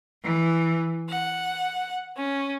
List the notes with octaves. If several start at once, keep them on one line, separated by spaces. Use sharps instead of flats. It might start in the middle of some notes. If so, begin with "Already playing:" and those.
E3
F#5
C#4